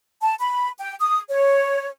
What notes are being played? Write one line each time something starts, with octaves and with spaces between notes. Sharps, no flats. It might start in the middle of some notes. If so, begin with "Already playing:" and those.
A5
B5
G5
D#6
C#5